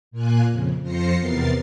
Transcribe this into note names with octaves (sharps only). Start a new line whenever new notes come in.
A#2 A#3 F4 G#5 F#6
F2 C#3
F2 F4 C5 A#6 C7 C#7
E2 C3 B3 A#4 A6 C7